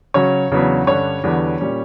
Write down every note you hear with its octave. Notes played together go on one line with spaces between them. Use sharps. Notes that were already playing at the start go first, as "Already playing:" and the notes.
C#3 F#3 C#4 C#5
E2 C#3 F#3 B3 D4
G2 D3 G3 C#4 C#5
E2 D3 G3 B3
A#2 G3 C#4